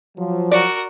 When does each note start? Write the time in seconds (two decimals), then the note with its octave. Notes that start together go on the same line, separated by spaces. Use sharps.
0.17 F3 F#3
0.51 F#4 A#4 D5